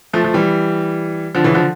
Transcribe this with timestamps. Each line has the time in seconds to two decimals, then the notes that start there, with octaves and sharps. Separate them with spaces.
0.13 F3 A3
0.25 F3
0.34 E3 G3
1.35 D3 F3
1.44 C#3 E3
1.55 D3 F3